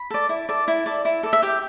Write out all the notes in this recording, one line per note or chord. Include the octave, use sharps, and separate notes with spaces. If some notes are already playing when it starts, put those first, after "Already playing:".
Already playing: B5
A4 D5
E4
A4 D5
E4
A4 D5
E4
A4 D5
E5
G4 G5